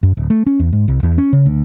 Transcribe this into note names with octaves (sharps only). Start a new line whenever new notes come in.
F#2
D1
A3
C#4
E2
G#2
C2
E2
C#4
C#3
D2